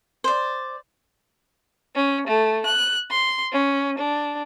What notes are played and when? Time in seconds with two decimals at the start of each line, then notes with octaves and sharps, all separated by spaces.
0.24 C5 D5
1.94 C#4
2.26 A3
2.64 F#6
3.08 C6
3.51 C#4
3.97 D4